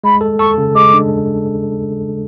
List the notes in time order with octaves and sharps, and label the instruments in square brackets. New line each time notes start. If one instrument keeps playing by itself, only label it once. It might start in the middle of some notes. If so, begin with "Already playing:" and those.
[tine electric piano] G#3 [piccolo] B5
[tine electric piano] A4
[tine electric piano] A4 [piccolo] C#6
[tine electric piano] C#3
[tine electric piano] G#3 [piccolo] D6
[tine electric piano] D4